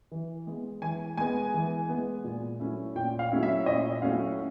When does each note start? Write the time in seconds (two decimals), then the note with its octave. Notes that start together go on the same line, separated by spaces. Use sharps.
0.11 E3
0.47 G#3 B3
0.82 E3 G#5
1.17 G#3 B3 G#5
1.54 E3
1.89 G#3 B3
2.24 A#2
2.60 F#3 A3 C#4 E4
2.96 A#2 G5
3.19 F5
3.32 F#3 A3 C#4 E4
3.43 E5
3.66 A#2 D#5
4.02 F#3 A3 C#4 E4 F5